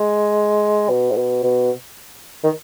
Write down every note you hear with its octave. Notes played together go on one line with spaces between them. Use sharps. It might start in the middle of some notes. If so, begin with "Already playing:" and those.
Already playing: G#3
B2
G#2
B2
B2
D#3